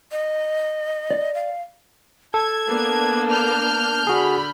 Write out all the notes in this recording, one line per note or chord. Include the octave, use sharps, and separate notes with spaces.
D#5
D5
F5
A4 A5 G#6
A#3 B3 D4
F6 G6
D3 F#4 G#4 B5